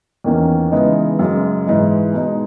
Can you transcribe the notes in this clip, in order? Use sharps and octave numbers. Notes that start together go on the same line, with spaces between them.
E2 D#3 A#3 C#4
C#3 E3 G#3 B3 D#4
F#2 C#3 G#3
G#2 E3 G#3
B2 G#3 D#4